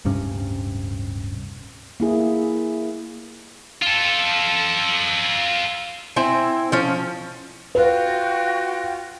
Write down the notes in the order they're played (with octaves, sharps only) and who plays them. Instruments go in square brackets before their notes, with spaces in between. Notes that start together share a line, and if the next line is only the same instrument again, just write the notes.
[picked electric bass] D1 G2 C3 C#4
[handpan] A#3 E4 G#4
[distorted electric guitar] F4 A4
[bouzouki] C4 E4 G#5
F3 C#4
[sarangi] F4 [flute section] F#4 G5 [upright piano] B4